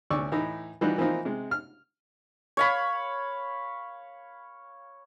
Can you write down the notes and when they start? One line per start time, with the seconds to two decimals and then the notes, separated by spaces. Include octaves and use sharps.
0.10 D2 C#4 D5 C#6 E6
0.32 A2 E3 D#4
0.81 E3 F3 G3 D#4 F#4 B4
0.98 E3 F3 A#3 C4 D#4
1.25 C3 G#3
1.51 F6
2.57 C#5 F5 B5